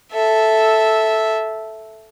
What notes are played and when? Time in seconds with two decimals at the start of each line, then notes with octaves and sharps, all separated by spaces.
0.13 A4 E5